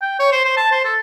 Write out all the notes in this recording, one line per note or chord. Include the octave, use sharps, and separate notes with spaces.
G5
C#5
C5
C5
A5
C5
A4